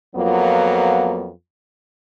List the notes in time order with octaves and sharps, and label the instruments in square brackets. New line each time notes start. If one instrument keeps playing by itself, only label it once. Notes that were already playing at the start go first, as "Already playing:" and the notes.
[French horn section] F2 F#3 A#3 B3 F4